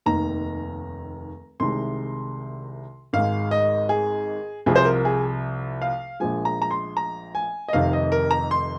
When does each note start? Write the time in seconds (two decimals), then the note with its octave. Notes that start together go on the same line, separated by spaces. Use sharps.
0.06 F1 D#2 D#3 A#5
1.60 C2 C3 D#3 G#3 C6
3.13 G#1 G#2 G#3 F5
3.51 D#5
3.89 G#4
4.66 C2 C3 F3 G#4
4.76 C5
4.85 A#4
5.05 G#4
5.82 F5
6.20 A#1 A#2 F3 G#3 G#5
6.45 A#5
6.62 A#5
6.71 C6
6.97 A#5
7.35 G#5
7.68 D#5
7.73 F1 F2 C3 D#3 F5
7.93 D#5
8.12 A#4
8.31 A#5
8.51 C6